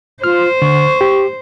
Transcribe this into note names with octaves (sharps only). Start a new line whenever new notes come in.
F4 C5 F6
D3 C#6
G4